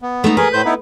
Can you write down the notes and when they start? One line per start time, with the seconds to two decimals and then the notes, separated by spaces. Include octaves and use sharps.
0.02 B3
0.24 A3 D#4
0.37 G#4 A#4 B4
0.53 A2 C5 G6
0.65 B3 D#4 E4